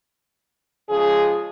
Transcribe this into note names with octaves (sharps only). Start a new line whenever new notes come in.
C#3 F3 G#3 G#4